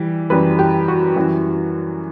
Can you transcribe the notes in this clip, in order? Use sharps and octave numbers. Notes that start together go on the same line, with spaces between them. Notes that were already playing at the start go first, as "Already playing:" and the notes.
Already playing: E3 G3
F#2 E3 G3 B4
G4
F#4
F#2 E3 G3